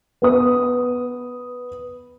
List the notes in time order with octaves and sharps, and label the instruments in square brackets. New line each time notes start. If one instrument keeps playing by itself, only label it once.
[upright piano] B3 B4 D#6